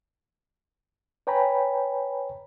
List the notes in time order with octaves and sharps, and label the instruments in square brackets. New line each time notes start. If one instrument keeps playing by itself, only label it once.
[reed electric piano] B4 C#5 G5 G#5 A#5 B5